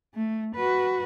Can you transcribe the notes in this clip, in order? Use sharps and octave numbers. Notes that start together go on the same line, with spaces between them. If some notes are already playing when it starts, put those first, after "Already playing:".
A3
F#4 B4